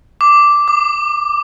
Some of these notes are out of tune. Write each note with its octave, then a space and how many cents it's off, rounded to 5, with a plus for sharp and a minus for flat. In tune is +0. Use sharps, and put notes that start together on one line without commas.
D6 -5
D6 +30